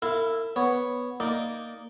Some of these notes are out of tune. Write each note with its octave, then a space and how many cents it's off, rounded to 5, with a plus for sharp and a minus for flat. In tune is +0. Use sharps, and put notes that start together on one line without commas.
E4 +0 A#4 -40 F5 -25
B3 +0 C#5 +0
A#3 +0 D#4 +0 D5 +0